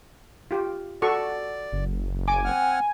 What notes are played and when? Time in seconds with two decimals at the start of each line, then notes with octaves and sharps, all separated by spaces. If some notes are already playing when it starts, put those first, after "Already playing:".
0.51 F4 G4
1.02 F#4 A4 D5 C#6
1.72 F#1
2.28 C#3 G#5 D6
2.45 C4 F#5 F6